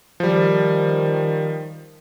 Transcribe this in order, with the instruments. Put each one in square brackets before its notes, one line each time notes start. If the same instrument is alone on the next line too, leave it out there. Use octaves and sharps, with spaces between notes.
[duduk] D#3 [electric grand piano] F3 G3